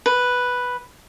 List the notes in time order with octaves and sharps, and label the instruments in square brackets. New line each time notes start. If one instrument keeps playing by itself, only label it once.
[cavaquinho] B4